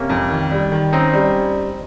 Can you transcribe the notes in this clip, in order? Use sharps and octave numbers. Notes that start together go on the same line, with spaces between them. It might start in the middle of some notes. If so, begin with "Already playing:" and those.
Already playing: C3 A#3 C#4
F2
D#3
G3
D#3
C4 C#4 D#4
G3